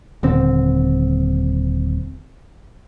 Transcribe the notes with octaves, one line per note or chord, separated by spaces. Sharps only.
D#1 D3 C4